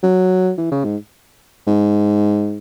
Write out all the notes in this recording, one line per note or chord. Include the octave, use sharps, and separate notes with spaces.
F#3
E3
C#3
G#2
G#2